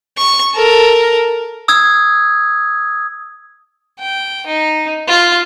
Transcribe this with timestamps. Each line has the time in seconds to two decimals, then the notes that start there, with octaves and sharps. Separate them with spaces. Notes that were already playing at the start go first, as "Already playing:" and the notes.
0.18 C#6
0.55 A4 A#4
1.68 D#6 E6 G#6
4.00 G5
4.46 D#4
5.08 F4